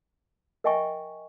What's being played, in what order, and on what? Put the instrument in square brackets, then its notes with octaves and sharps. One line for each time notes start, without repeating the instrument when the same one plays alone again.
[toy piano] A#4 D#5 E5 G5 G#5 C#6